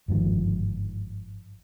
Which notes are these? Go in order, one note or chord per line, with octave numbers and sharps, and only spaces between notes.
G1 G#2 D#3 F3